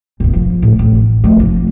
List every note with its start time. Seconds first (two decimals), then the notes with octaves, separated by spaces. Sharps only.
0.20 E1 C3
0.33 F3
0.62 A2
0.79 A1
1.24 F3 A3
1.40 F1 F3